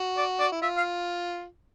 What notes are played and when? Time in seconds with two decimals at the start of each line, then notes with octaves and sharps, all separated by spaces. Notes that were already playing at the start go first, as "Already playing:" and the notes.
Already playing: F#4
0.17 D5
0.40 D5
0.52 E4
0.62 F4 E5
0.77 F5